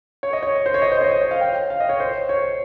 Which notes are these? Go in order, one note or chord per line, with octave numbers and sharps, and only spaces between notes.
C#5
D#5
C#5
C5
C#5
D#5
C5
D#5
C#5
D#5
C#5
F5
G5
F5
D#5
C#5
C5
C#5